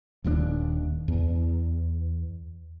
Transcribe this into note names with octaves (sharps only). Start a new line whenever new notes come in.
D#1 D#2 E3 D4
E2